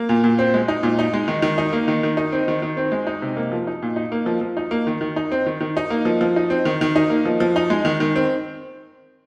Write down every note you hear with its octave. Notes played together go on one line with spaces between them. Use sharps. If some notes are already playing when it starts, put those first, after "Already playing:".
Already playing: A#3
A#2
A#2
C4
G#3
D#4
A#2
D#4
G#3
D#3
D#3
D#4
A#3
D#3
D#3
D#4
C4
D#3
D#3
C4
G#3
D#4
C3
A#3
F3
D#4
A#2
D#4
A#3
F3
F3
D#4
A#3
D#3
D#3
D#4
C4
D#3
D#3
D#4
A#3
F3
F3
D#4
C4
D#3
D#3
D#4
A#3
F3
F3
D#4
G#3
D#3
D#3
C4